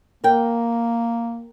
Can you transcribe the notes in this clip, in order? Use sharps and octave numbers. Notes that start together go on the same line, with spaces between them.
A#3 A#4 G5